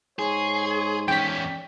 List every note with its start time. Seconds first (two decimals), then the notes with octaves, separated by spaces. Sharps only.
0.19 G#2 G#4 C#5 C6
1.08 E2 C#4 G5 B6